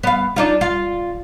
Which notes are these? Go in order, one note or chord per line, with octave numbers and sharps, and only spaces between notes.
B3 F5
D4 D#4 F4
F4